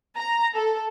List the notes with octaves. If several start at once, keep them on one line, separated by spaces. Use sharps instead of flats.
A#5
A4